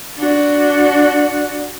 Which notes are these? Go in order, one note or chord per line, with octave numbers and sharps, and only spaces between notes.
D4 F#4